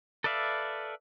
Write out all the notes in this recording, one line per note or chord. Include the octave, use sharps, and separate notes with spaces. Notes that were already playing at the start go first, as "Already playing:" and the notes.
A4 B4 D5 E5 F5